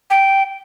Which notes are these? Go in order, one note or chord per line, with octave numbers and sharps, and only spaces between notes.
G5